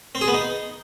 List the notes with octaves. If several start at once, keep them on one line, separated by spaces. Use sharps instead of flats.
C4
G#4
B3
D#4